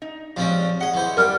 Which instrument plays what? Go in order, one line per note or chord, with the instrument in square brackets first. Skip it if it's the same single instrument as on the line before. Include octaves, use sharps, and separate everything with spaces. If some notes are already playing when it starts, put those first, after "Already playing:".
[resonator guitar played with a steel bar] D#4
[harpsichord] F3 C4 C#4 [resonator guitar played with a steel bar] G3 G#3
[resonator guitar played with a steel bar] G#4 F#5 [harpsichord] D#5
[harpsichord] E3 C5
[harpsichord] G3 D4 [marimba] A#4 F6 [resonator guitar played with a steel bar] B4 G5